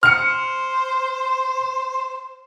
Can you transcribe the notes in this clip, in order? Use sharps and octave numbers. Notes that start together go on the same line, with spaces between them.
C5 F6 C#7